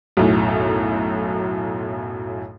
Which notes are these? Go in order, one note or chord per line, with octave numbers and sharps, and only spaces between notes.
B1 F#2 A2